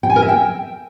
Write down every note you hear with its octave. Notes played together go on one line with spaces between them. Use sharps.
G5
G#5
A#4
E5
G5